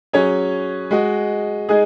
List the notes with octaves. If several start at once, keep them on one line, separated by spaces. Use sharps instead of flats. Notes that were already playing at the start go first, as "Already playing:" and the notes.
F#3 C#4 G#4 C#5
G#3 F#4 D#5
G#3 D#4 G#4 D#5